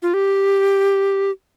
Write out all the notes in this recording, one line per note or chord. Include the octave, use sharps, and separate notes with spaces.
F4
G4